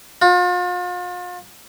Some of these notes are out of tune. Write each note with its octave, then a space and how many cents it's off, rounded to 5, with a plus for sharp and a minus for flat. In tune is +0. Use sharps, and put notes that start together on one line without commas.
F4 +40